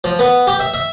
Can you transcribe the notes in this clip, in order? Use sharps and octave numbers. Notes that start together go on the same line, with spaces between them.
F3
B3
G4
E5
E5